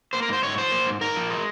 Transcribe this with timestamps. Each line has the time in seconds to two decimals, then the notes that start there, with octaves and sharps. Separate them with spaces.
0.13 A#3 C5
0.23 A#4
0.29 G#2 C5
0.43 G#2 C#5
0.58 F3 C5
0.72 A#3
0.87 G#2
1.01 G#2 A#4
1.16 F3
1.30 G#3